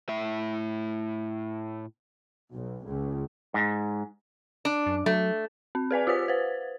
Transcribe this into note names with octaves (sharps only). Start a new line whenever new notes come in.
A2 E5
B1
C#2
G#2
D4
F#2
F#3 A3
C4
G#4 B4 D5 G#5
F4 G4 C5 D#6 B6
B4 C5